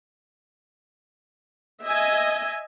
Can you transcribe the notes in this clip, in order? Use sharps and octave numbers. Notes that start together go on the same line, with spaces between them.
D#5 E5 G#5